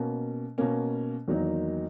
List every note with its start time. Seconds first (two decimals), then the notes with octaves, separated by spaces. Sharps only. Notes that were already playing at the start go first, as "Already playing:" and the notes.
Already playing: B2 A#3 C#4
0.58 B2 A#3 C#4
1.28 E2 D#3 F#3 A#3 D#4